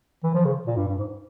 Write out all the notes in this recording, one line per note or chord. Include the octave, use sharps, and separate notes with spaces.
E3
F3
C#3
A#2
G2
G2
G#2